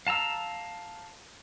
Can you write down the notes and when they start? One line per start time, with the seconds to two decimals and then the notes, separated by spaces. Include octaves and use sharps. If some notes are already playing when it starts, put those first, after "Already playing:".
0.07 F5 A5 A#5 E6